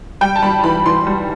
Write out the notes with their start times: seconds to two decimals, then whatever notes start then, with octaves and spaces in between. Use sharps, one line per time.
0.21 G3 G5
0.36 A5
0.42 G3 B5
0.64 E3 B5
0.86 E3 C6
1.07 G3